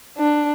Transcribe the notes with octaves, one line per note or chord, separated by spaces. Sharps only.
D4